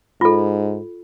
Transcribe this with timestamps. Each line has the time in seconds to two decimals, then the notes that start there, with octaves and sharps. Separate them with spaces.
0.21 G#2 F4 A4